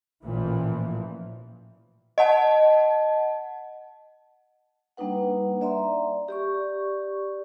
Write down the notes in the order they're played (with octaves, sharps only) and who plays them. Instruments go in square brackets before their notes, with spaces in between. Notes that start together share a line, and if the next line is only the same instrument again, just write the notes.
[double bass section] A1 A#2 E3 F3
[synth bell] D#5 F#5 A5
[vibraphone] G3 A#3 D4 D#4 B4 F#5
D5 E5 A#5 C6
G4 D5 C#6